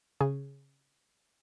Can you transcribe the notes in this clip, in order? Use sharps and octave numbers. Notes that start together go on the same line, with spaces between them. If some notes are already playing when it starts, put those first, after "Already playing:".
C#3 G#4